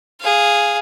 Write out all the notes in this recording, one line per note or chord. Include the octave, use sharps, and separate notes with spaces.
G#4 F5